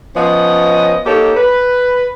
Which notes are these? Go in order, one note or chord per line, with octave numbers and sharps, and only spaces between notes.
F3 B3 C#4 D#5
A#3 D#4 G4 A4 C#5
B4